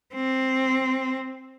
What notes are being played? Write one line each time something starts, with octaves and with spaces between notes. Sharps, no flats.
C4